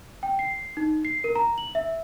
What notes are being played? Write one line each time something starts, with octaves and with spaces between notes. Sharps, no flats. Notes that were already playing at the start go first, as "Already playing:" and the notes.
G5
C7
D#4
C7
A#4
A#5
F#7
E5